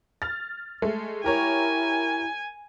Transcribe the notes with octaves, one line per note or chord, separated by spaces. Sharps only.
F6 A6
G#3 A3
E4 G4 A#4 C#5 G#5